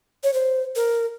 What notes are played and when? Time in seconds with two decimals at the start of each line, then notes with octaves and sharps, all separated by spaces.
0.24 C#5
0.34 C5
0.76 A#4